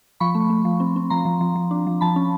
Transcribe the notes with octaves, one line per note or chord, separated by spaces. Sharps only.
F3 B5 C#6
A3
A3
F3
C4
C4
F3 A#5 C6
F3
F3
F3
D4
F3
F3 A5 B5
C#4